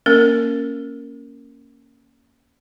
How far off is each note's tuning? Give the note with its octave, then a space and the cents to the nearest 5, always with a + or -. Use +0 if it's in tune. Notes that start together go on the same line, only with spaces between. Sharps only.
A#3 +0 C#4 +0 A#4 -15